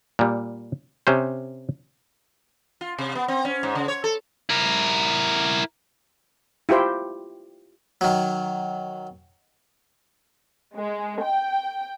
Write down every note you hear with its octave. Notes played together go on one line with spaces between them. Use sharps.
A#2 G3
C3 C#4 C5
F4
C3
B3
C4
C#4
G#2
C#3
C#5
A4
E4 A#4
E4 F4 G4 C5 G5
D#3 F#3
G#3
G5